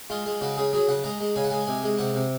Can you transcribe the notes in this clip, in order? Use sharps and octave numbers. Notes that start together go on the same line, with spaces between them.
G#3 F4
G#3
C#3 F#4
C#3 G#4
F#3 G#4
C#3 F#5
G#3 A#5
G#3
C#3 G#5
F#5
G#3 G#5
C3 G#5
G#3
C3 F#5
C3